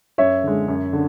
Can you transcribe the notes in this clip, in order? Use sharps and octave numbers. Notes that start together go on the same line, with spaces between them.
F#2 C#5 E5
D3 G#3
F#2
D3